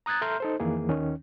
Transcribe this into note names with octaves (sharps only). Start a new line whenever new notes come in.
A#5 D#6 F#6 G#6 A6
A4 E5 A#5 C6 F6 G6
D#4 A4 C5
F2 D#3 E3 A#3 G#4
D#2 D#3 C#4